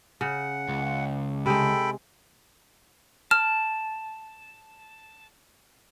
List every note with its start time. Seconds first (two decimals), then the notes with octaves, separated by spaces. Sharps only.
0.21 C#3 F#5
0.68 C#2
1.46 C3 G#3 A4 G5 B5
3.31 A5 F6